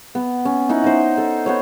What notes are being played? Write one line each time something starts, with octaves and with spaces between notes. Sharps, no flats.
B3
C#4
D#4 E4 F#5 C#6
D#4 C5
A4
B3 C5 C#5